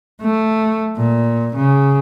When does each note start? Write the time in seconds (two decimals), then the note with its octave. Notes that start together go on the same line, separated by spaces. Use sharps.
0.21 A3
0.97 A#2
1.55 C#3